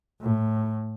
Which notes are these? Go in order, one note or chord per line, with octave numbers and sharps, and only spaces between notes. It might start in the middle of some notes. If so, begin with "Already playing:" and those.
A2